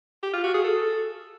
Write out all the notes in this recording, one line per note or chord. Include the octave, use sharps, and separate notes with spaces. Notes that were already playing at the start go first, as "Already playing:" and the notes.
G4
F4
F#4
G#4
A4